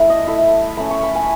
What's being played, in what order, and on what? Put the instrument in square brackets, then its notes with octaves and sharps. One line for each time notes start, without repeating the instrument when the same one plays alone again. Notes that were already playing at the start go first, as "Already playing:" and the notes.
Already playing: [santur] A3 E4
D#5
A3 E4
A3 C#4 E4 B5
C#6
B5
G#5